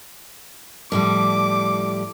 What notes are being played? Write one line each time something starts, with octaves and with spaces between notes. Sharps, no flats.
A2 F3 G3 D6